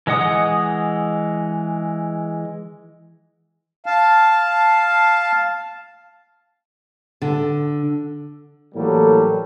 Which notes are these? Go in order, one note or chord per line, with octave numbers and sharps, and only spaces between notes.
E3 G#3 D#5 F#5 D#6
F5 A5
D3
A2 E3 F#3 G3 A#3 A4